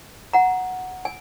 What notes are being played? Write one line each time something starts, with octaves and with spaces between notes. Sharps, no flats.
F#5 A#5
G#5